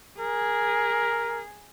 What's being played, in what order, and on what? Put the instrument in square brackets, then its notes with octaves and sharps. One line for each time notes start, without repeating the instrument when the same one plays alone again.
[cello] G#4 [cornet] A#4